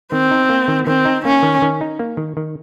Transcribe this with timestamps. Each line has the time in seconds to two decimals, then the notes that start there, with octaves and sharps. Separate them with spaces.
0.12 D#3 C4
0.31 D#4
0.49 A#3
0.68 D#3
0.87 D#3 C4
1.05 D#4
1.25 A#3 C#4
1.43 D#3
1.62 D#3
1.81 D#4
1.99 A#3
2.17 D#3
2.37 D#3